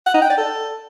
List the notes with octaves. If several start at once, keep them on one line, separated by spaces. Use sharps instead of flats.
F#5
D#4
G5
D5
A4